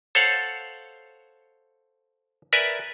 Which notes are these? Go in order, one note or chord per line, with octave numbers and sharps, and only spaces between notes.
A4 C5 C#5 F5 F#5
A#4 B4 D5 E5 G#5 A#5